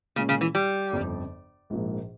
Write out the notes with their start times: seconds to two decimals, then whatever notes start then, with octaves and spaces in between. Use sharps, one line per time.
0.16 A#2 C#3 G#3 C#4
0.29 C#3
0.41 E3
0.55 G3
0.92 G1 F2 C#3
1.70 A#1 G#2 F3 A#3